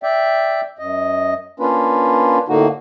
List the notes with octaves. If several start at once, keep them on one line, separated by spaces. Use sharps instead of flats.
D5 E5 G5
F#2 D#5
A#3 C#4 D4 F4 B4
A2 D3 A#3 D#4 F#4